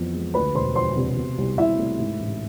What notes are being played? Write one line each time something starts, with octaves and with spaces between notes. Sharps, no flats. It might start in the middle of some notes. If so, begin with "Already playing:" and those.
Already playing: F2 E3 B3
G#3
D2 B4 B5
E1 C5 C6
F3 C5 C6
C3
B2
C2
C2 E4 E5
A3
G#2
A1